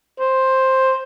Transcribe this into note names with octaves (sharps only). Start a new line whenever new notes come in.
C5